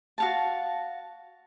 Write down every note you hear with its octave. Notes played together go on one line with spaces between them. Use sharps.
F#4 F5 A5